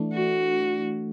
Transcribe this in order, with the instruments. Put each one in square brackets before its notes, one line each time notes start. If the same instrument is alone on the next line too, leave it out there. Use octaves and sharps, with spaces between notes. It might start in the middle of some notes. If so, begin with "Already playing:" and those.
Already playing: [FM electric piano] E3 A3 D4
[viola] F#4